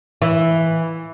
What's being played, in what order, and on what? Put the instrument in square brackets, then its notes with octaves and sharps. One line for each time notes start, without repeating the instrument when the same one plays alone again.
[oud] E3